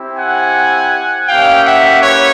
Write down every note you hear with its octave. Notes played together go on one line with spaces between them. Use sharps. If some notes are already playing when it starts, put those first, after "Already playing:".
Already playing: C4 E4 G4
F#5 G#5
A#3 C#4 E4 G4 F5 G5
E5 F#5
B4 C#5